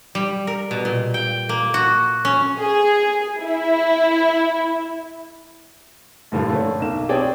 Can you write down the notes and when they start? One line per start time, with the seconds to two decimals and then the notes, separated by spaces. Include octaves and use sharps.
0.15 G3
0.47 A#4
0.71 B2
0.85 A#2
1.14 G5
1.49 A#3
1.74 F#4
2.25 C#4
2.58 G#4
3.41 E4
6.32 G2 A#2 D3 F3 A3
6.50 D3 A3 C#4
6.80 B1 A#3 E7
7.09 C4 D4 G#4 C#5 D5 G5